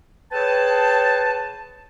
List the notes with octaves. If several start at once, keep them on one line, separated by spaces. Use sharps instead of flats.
G#4 B4 C#5 G5 A5